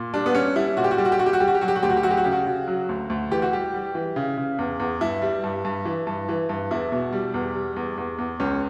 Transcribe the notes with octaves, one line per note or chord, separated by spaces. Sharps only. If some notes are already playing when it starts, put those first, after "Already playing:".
Already playing: A#2
G3 D4
B3
G3 C#4
G3 E4
A#2 F#4
G4
F#4
G3 G4
F#4
G4
G3 F#4
G4
F#4
G3 G4
F#4
G4
F#3 F#4
G4
F#4
D2 G4
F#4
G4
F#3 F#4
G4
F#4
C#3 G4
F#4
C#3
F#3
D2
D2
E3 G4
F#4
G3 G4
G3
E3
C#3
C#3
E2
E2
G2 E4
G3
G2
G2
E3
G2
E3
G2
E2 E4
B2
G3
E2
G3
E2
E2
E2
C#2 C#4